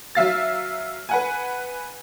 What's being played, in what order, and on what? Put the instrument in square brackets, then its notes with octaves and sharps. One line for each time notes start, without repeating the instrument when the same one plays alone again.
[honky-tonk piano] F#3 E5 F5 A6
B4 F#5 G#5